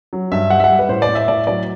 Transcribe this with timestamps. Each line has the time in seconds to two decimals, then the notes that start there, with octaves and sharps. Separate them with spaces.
0.13 F#3
0.32 G2 E5
0.50 G3 F#5
0.60 E5
0.64 F#5
0.70 G3
0.79 B4
0.89 A2 C5
1.02 D5
1.09 A2
1.15 E5
1.28 A2 D5
1.47 F#3 D5